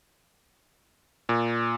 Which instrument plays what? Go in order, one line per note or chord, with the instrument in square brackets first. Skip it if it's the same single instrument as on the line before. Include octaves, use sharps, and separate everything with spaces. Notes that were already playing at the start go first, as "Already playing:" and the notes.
[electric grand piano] A#2